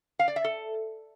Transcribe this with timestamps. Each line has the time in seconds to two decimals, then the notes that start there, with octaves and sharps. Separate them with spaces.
0.19 F5
0.28 D5
0.36 E5
0.44 A4